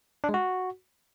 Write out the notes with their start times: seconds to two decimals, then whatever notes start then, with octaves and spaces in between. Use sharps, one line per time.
0.24 D4
0.29 G#3
0.34 F#4